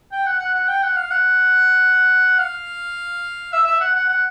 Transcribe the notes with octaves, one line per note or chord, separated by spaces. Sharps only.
G5
F#5
F#5
F#5
G5
F#5
F5
F#5
F5
E5
E5
F#5
F#5
F#5